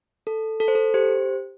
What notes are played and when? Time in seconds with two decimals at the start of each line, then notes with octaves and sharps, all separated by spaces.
0.27 A4
0.60 A4
0.68 C5
0.75 A4
0.94 G4 C5